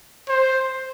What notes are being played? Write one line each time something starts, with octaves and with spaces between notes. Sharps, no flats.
C5